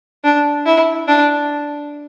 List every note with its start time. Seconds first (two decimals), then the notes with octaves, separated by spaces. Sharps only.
0.24 D4
0.66 E4
1.08 D4